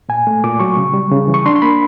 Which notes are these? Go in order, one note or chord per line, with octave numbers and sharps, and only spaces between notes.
A#2 G#5
A3
A#2 D6
F#3 C#6
C#3
G3
C#3
E3
C#6
D4 C6
C6
A#3 B5